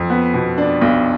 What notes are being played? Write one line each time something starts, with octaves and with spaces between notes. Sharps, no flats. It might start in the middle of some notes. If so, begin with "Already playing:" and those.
Already playing: F2
B3
B2
D4
B1